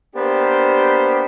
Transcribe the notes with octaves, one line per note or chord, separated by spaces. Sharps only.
A#3 B3 D4 G4 C5